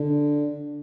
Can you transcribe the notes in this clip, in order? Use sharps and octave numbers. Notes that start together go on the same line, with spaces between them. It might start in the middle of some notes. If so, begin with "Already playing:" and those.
Already playing: D3